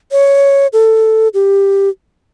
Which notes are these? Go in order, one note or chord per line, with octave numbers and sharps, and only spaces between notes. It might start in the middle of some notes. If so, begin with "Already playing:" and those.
C#5
A4
G4